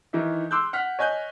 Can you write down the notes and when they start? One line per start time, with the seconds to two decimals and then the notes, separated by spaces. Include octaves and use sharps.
0.13 D#3 E3 D#4 E5
0.51 C6 D6 E6 F#6 G6
0.73 F#5 F6 B6
0.99 C#5 D#5 G#5 F#6 G6